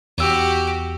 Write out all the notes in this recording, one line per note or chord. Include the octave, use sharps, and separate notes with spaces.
E2 F#4 G4 E6